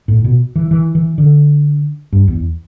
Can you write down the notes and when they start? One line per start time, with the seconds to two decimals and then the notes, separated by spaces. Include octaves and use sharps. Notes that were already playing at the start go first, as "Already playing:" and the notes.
0.08 A2
0.24 B2
0.56 E3
0.71 E3
0.95 E3
1.18 D3
2.13 G2
2.28 E2